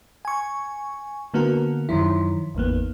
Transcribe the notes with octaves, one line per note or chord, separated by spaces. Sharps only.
G#5 C#6
D3 A#3 B3 F#4 A#4
F#2 D#3 F3 E4
G#1 E2 A#3 B3